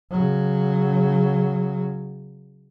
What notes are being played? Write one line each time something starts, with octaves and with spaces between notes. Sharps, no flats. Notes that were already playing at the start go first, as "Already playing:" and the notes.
C#3 F#3